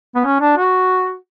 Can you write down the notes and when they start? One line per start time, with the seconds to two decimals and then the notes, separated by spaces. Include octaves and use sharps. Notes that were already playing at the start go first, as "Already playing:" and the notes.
0.15 B3
0.25 C#4
0.40 D4
0.57 F#4